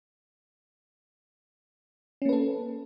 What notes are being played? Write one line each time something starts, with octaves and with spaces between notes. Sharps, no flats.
A#3 C#4 A4 B4